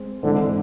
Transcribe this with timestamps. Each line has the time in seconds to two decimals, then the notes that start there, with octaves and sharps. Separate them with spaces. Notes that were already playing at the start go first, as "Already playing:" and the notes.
Already playing: G#3 C4
0.23 G#2 D3 E3 G#3 C4